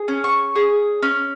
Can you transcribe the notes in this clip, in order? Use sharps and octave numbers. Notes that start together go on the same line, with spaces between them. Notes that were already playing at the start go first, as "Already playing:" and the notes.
Already playing: G#4
C#4
C#6
G#4
C#4